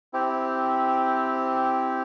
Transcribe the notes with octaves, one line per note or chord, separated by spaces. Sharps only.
C4 E4 G4